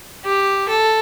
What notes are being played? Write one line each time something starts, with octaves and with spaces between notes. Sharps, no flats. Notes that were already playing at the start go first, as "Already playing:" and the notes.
G4
A4